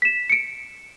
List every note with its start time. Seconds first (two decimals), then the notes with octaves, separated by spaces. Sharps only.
0.02 B6 E7
0.30 C#7 D7